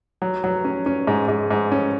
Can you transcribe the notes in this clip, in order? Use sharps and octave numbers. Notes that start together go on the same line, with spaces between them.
F#3
F#3
C#4
C#4
G#2
G#2
G#2
C#4